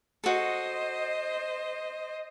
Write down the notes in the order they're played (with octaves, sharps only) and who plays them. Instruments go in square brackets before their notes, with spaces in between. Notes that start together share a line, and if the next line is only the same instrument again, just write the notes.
[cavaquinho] F#4 A4 [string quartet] C5 D#5